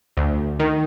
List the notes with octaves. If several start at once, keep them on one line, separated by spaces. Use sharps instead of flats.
D2
D#3